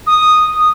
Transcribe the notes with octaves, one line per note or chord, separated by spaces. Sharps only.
D#6